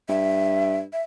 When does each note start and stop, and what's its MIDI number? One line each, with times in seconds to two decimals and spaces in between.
0.09 0.85 43
0.09 0.78 76
0.93 1.02 76